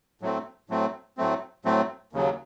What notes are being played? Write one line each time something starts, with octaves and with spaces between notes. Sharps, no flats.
A2 F#3 A3 C4
A2 F#3 A3 C4
A2 F#3 A3 C4
A2 F#3 A3 C4
D#2 C#3 F#3